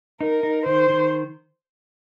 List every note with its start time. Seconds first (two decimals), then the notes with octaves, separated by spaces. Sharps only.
0.21 D#4 A#4
0.43 D#4
0.66 D#3 C5
0.89 D#3